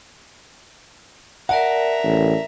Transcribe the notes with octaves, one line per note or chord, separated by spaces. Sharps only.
A#4 D5 E5 F#5 A5 A#5
A1